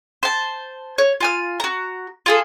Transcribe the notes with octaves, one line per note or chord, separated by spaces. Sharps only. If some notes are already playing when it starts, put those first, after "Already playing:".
C5 A5
C#5
F4 G#5 F6
F#4 A#5
F4 G#4 A4